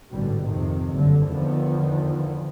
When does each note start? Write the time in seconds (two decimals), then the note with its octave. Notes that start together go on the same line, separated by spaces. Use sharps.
0.10 A1 G#2 B2 D3 G3
0.45 F2 C3 D#3
0.92 F#1 G2 D3
1.26 E2 D3 D#3 F3 B3